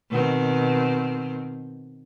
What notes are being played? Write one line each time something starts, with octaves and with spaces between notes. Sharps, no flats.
B2 D#3 C4